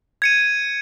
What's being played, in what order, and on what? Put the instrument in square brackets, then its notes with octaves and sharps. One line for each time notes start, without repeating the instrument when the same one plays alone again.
[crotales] G#6 C#7 D#7